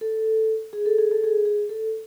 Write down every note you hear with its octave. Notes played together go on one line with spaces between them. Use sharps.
A4
G#4
A4
G#4
A4
G#4
G#4
A4